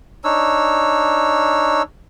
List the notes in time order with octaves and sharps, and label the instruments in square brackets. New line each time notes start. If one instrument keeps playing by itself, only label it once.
[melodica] D4 D#4 C#5 E6